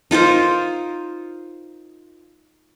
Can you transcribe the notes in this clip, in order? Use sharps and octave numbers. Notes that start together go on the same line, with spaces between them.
D#4 F4 A#4 C5